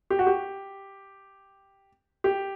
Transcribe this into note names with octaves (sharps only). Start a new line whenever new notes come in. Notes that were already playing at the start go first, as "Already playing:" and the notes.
G4
F#4
G4
G4